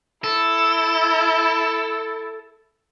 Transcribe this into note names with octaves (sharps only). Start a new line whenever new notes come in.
E4 A4